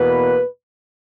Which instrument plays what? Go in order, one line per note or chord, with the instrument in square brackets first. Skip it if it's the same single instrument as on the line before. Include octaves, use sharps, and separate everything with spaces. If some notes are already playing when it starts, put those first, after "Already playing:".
Already playing: [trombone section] E2 B2 A#3 B4